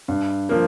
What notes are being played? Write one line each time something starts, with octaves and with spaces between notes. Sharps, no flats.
G2
F3 A#3